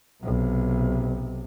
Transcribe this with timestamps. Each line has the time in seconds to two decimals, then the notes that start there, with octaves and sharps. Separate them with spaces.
0.23 B1 C3